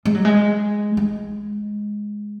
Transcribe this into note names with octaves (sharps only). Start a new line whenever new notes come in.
G#3
F#3
G#3
G#3